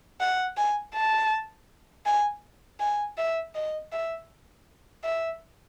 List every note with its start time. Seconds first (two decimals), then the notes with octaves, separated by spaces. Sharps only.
0.20 F#5
0.57 G#5
0.94 A5
2.06 G#5
2.80 G#5
3.17 E5
3.55 D#5
3.92 E5
5.03 E5